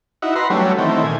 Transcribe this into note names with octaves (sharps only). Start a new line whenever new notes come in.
D#4 E4 F#4
B4 F#5 A#5 C6
F#3 G3 A3 C#4
D#3 E3 A3 C4
A#2 G#5